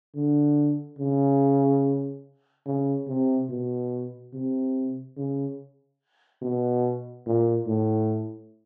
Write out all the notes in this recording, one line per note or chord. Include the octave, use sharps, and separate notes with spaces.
D3
C#3
C#3
C3
B2
C3
C#3
B2
A#2
A2